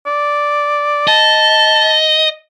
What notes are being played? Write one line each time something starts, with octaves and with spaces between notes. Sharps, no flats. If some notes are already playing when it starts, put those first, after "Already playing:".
D5
D#5 A5